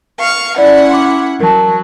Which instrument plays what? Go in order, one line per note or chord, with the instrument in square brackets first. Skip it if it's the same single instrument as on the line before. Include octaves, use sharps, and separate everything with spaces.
[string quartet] F5 C#6
[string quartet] C#4 E4 F#5 [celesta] D5
[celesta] C6 D6
[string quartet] F#3 [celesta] A#4 A5